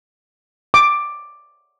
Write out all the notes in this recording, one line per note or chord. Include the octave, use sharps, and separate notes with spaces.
D6